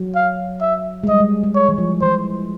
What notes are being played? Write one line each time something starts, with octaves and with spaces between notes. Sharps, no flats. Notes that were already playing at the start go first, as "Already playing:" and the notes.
Already playing: F#3
F5
E5
G#3
G3 D#5
G#3
G#3
C#5
E3
F3
E3 C5